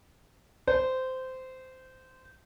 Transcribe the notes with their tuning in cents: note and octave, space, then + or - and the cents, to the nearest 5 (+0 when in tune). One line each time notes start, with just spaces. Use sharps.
C5 -15